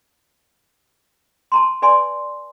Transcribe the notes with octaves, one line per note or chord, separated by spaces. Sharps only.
A5 A#5 C6
B4 D5 G#5 C6